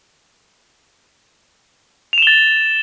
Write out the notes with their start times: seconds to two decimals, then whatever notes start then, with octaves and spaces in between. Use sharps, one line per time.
2.13 F7
2.18 E7
2.22 G7
2.27 A6